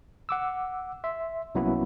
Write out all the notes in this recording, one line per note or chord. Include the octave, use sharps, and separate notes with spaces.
F#5 D6 E6
E5 C6
C2 F#3 A#3 B3 C#4 E4